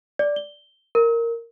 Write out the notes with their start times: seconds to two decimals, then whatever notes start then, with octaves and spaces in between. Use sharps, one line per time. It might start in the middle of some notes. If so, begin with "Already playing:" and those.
0.19 D5
0.36 G7
0.95 A#4